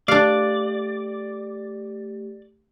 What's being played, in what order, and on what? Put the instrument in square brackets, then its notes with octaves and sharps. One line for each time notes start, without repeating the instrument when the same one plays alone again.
[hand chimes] A3 G4 [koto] D4 F5 [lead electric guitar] D5